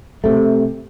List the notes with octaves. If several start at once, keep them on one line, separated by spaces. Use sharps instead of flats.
C3 A3